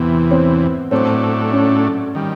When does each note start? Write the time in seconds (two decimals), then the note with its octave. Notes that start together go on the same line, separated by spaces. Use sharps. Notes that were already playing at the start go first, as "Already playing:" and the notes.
Already playing: E2 C3 E3 B3
0.31 C4
0.91 A2 F#3 A3 C4 D4
1.52 C#4
2.15 D#3 G3